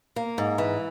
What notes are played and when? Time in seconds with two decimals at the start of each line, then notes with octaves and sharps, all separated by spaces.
0.16 A#3
0.38 G#2
0.58 E3